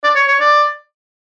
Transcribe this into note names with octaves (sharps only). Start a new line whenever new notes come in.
D5
C#5
C#5
D5